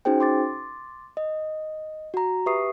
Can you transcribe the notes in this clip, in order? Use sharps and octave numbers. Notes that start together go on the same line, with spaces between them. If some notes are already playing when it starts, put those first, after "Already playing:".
C#4 D#4 F#4 G#4 C5 G5
C6 D6 A6
D#5
F#4 A#5
G4 B4 E5 C#6 D#6 C7